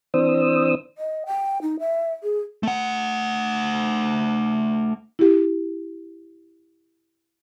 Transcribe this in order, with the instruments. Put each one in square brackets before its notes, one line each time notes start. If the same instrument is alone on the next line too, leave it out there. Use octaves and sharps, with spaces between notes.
[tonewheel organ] E3 C4 D4 C5 D#6 E6
[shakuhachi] D#5
G5
D#4
E5
G#4
[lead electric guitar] A3 F#5
[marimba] E4 G4